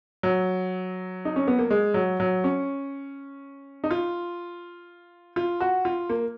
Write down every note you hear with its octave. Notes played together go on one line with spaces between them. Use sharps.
F#3
D#4
C#4
B3
A#3
G#3
F#3
F#3
C#4
D#4
F4
F4
F#4
F4
A#3